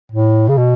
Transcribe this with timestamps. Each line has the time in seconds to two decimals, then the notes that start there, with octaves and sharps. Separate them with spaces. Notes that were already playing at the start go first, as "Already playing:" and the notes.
0.12 A2
0.49 C#3
0.58 B2